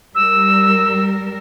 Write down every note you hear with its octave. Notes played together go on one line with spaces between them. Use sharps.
G3 A#4 E6